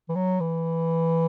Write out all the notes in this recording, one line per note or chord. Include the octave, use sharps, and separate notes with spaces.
E3
F#3
E3